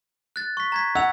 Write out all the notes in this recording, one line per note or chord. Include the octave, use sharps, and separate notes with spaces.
F#6 A6
C#6 B6
A#5 G#6 B6
F#5 E6 F7